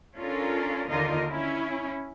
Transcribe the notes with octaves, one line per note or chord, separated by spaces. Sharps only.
C#4 D4 F4 A4 A#4
D#2 D3 D#4 F4 A#4 D#5
C#4 E4